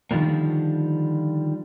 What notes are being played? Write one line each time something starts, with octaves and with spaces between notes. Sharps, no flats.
D3 D#3 F3 G3 A#3